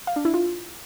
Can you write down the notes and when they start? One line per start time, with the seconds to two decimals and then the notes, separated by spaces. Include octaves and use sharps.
0.07 F5
0.16 D4
0.25 E4
0.34 F4